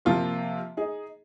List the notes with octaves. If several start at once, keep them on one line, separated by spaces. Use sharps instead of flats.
C3 F3 A#3 F4
D#4 G#4